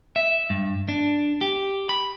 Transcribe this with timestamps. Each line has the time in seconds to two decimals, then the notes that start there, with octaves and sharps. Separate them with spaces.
0.16 E5
0.50 G2
0.89 D4
1.41 G4
1.89 B5